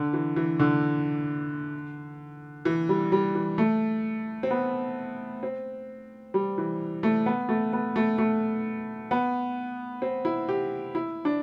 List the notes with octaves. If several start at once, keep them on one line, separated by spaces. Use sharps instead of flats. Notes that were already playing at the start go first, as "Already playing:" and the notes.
Already playing: D3
E3
E3
D3
E3
G3
G3
E3
A3
C4
B3
C4
G3
E3
A3
B3
A3
B3
A3
A3
B3
C4
E4
G4
E4
D4